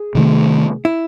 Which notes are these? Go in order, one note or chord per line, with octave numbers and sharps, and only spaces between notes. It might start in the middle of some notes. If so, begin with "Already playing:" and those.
Already playing: G#4
C3 D#3 A3
E4